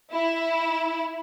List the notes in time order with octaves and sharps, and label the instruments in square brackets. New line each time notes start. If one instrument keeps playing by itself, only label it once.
[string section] E4